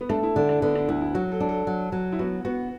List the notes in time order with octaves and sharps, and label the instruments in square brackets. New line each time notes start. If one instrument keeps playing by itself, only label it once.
[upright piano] B3
[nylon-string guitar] A3 [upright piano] D4
[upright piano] E4
[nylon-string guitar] D3 [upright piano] E4
[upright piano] D4
[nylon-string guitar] D3 [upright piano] B3
[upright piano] D4
[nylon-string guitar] D2 [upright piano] E4
[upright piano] E4
[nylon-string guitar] F#3 [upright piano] F#4
[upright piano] A4
[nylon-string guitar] D4
[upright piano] A4
[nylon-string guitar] F#3
F#3
[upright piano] E4
[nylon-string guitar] B3 [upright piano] F#4
[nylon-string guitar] B3 [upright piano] F#4